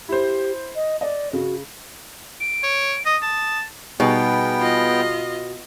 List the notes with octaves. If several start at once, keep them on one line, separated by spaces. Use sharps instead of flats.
E4 G4 C5
D#5
D5 D#5
C#3 F#4
D7
C#5
D#5 D#6
A5
B2 G3 B3 D#4 G#4 G5
F4 D#5